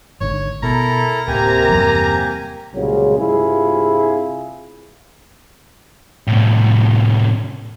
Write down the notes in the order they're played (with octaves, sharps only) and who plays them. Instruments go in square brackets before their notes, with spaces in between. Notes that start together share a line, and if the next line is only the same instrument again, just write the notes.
[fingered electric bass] G#1 G#2 D3 [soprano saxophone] C#5
[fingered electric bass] B2 [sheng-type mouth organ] E4 A4 A#4 [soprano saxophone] A#5
[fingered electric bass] D1 [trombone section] C3 A#4 [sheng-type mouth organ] A#3 G4 G#5
[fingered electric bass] E2 G2 F#3
[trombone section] C2 A#2 C#3 F#3 G#3
G2 C3 E4 F4 G#4
[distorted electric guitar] A2 C3